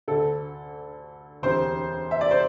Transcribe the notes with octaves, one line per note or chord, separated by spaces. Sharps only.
D2 D3 A4
E1 D2 C3 E3 C5
E5
D5
C5